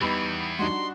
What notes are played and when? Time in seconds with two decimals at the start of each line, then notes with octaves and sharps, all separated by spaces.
0.01 E2 E3 G3 B3 D#4 B5 C#6 A6
0.59 G3 D4 D#4 F#4 F#5 C6